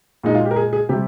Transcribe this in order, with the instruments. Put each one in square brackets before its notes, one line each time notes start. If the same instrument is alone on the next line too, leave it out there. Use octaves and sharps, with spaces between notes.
[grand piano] A#2 G#3 D#4
F4
G4
A#4
G#4
G#4
C3 G3 G4